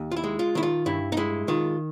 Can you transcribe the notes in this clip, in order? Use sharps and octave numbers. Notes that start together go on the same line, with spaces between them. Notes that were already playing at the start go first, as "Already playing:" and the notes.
Already playing: D#2
F4
E4
G#3
F4
D#3 E4
F4
G2 E4
D#4
G#3 E4
D#3 F4